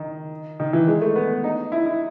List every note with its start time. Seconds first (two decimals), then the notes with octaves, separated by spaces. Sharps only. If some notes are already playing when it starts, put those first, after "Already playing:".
Already playing: D#3
0.60 D#3
0.73 E3
0.87 G#3
1.02 A3
1.16 B3
1.44 D#4
1.72 E4
1.86 E4